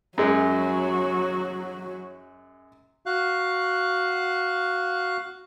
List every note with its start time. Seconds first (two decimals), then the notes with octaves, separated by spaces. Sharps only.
0.18 F#2 F#3 G#3 F#4
3.06 F#4 F5 F#6